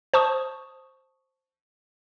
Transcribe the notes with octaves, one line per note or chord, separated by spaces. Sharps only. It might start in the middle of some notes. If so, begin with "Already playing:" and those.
C5 A5 C#6 D#6